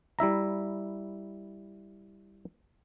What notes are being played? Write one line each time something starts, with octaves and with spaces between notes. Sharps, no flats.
G3 E4 E5 A#5